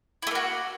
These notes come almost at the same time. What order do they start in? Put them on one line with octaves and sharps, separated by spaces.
E4 A3 A#3 F#4